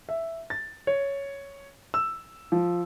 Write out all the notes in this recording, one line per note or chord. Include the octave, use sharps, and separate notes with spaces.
E5
A6
C#5
E6
F3